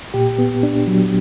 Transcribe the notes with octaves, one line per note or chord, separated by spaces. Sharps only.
A#2 G4
B3
D4
F#3